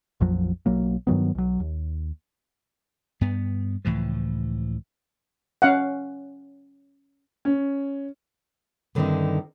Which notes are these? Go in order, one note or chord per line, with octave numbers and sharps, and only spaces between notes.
A#1 F2 F3 F#3
B1 F#3 A#3
G2 D#3 F#3 B3
B1 F#3
D#2
G2 B3
C#2 A2 E3 F3
C#4 F5 F#5
C#4
G2 D3 D#3 C4 D#4 E4